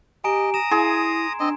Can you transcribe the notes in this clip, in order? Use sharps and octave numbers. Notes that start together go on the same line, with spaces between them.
G4 D#5 G#5 A#5 D7
A#5 D#6 E7
E4 G#4 C6
C4 D4 D#5